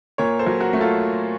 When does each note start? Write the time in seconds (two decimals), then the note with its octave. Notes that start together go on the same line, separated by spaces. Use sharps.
0.18 A#2 A#4 C#5
0.39 A4 C5
0.46 F#3
0.60 F#4 A#4
0.73 A3
0.80 F4 A4